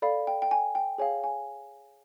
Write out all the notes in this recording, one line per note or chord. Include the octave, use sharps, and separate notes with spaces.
A4 D5 F5 B5
G5
G5
G#5
G5
G#4 C#5 F5 G#5
G#5